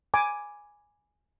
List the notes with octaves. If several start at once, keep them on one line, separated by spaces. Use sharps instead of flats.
G#5 B5 D6